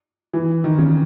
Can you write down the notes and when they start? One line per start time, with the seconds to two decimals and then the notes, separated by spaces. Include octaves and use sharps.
0.33 E3
0.64 D#3
0.78 C#3